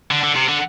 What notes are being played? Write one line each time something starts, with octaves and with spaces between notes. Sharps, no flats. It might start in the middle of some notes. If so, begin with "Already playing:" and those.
D3
D3
C3
D3